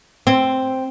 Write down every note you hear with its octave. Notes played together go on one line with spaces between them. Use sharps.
C4